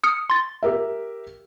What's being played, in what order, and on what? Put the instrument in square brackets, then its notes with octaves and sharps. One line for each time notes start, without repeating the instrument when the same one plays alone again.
[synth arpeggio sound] D#6 F6 C#7
C6 A6
[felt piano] G4 A#4 E5